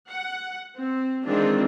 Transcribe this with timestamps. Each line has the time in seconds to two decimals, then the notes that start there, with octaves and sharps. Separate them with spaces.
0.11 F#5
0.77 C4
1.26 D#3 E3 G#3 C4 D4 F4